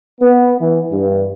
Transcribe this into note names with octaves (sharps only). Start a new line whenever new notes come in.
B3
E3
G2